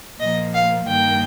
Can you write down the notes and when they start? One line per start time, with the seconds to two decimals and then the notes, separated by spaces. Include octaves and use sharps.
0.20 A#2 F3 A#3 D#5
0.53 F5
0.86 G2 D#3 A#3 G5